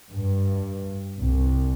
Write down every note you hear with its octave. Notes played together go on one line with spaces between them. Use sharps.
G2
C2